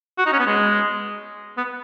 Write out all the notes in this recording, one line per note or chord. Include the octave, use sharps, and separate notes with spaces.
F#4
D#4
C#4
B3
G#3
B3